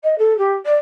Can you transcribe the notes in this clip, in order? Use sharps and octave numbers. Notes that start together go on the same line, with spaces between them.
D#5
A4
G4
D5